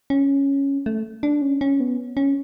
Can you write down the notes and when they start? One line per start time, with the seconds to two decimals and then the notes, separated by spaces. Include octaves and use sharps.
0.10 C#4
0.86 A3
1.23 D4
1.42 C#4
1.61 C#4
1.80 B3
2.17 C#4